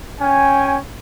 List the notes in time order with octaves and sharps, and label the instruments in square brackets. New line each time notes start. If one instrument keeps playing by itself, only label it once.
[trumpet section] C#4 G5 G#5